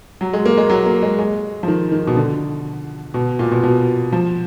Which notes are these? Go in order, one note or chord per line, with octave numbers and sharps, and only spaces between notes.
F#3
G#3
A#3
G#3
F#3
A#3
G#3
G#3
F3
D#3
D#3
B2
D3
B2
A#2
B2
B2
F3